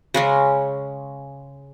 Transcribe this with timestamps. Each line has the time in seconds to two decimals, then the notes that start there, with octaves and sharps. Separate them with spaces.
0.14 C#3 G#3 C#4